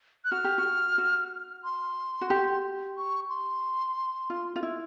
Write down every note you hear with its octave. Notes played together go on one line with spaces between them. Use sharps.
F#6
F#4 F6
G4
F#4
F#4
C6
F#4
G4
C#6
C6
F4
F4
E4